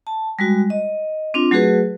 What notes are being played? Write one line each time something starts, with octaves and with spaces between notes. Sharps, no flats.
A5
G3 G#3 F#4
D#5
C4 D4 F4
F#3 A3 F#4 G#4 B4